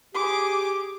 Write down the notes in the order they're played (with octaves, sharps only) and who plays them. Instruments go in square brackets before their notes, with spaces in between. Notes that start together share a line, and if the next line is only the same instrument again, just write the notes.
[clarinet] G4 [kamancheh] G#4 D6